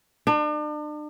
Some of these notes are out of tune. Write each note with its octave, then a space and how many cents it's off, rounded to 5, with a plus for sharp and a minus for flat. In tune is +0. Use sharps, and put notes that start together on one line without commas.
D4 +40